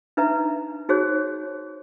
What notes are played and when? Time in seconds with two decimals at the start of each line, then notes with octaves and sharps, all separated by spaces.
0.17 D4 D#4 B4 E5 A#5
0.89 D#4 F#4 G#4 C5 C#5